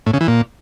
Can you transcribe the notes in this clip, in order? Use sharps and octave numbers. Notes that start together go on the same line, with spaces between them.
A2
C#3
E3
A#2